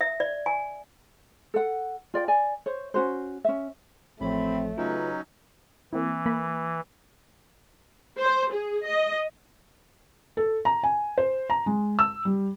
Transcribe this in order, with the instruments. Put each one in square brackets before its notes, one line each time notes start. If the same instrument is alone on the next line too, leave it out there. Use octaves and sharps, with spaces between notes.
[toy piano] E5
D5
G#5
[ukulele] A4 F#5
F4 D5 G5
D5 G#5
C5 C#5
C#4 F#4 C5
C#4 E5
[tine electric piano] A1 F3 C#5 [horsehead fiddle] A3 [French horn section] C4 [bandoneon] B5
[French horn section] C#3 B4 [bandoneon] F#3 C#4 D#4 [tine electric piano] F4
[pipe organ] E3 [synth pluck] A#3 C4 E4
[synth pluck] A#3 B5
[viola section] C5
G#4
D#5
[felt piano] A4
A#5
G#5
C5
A#5
G#3
E6
G3